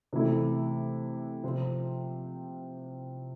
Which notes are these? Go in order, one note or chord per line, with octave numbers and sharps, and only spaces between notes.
C3 E3 A3 E4 A4
C3 F3 C4 F4 C5